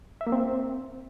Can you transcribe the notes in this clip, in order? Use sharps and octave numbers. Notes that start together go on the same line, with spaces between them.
E5
A#3
C4